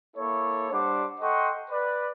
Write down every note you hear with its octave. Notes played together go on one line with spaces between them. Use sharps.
A#3 E4 A4 C#5
G3 D4 C5 F#5 D6
A4 D#5 F#5 G5 C6 C#6
B4 D5